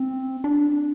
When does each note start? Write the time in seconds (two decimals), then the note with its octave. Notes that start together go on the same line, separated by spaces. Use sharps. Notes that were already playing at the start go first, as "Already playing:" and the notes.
Already playing: C4
0.44 D4